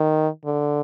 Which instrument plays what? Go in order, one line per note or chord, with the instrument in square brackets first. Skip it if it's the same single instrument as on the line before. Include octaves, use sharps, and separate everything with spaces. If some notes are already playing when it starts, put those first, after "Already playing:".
Already playing: [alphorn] D#3
D3